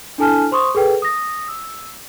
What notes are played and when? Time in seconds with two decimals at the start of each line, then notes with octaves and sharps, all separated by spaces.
0.18 D4 E4 A4 G#5 A5 F6
0.52 C5 C6 C#6 D#6
0.75 G#4 A4 B4 G5
1.02 D#6 A#6
1.48 E6